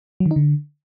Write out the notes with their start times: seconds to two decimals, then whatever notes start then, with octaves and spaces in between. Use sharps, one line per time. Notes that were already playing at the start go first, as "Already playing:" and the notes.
0.20 F#3
0.26 D#3
0.31 D#4
0.36 D3